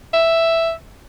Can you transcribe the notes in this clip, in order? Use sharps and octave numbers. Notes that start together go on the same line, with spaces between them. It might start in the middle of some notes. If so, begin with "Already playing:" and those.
E5